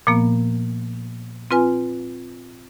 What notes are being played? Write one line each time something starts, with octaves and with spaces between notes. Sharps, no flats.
A#2 F3 A#3 B3
C4 F4 B4 G#5